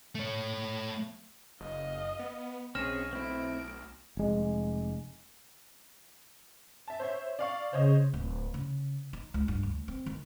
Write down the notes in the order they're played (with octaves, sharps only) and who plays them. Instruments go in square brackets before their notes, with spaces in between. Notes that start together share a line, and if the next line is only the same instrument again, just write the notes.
[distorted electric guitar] A3 C#5
[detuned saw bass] F#1 [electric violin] D#5 F5
[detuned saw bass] B3
[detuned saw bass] B1 [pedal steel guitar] C4 C#4 G#4 [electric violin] C#6 [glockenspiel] F6 A#6 E7
[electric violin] A3 D7 [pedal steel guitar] C4 E4
[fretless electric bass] F1 G#3
[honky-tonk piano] E5 A5
C5 C#5 E5
D5 F5 C#6
[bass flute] C#3 [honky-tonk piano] C5 C#5 D#5
[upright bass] D1
C#3
D#4
C#2
G2
D2
C4
D#3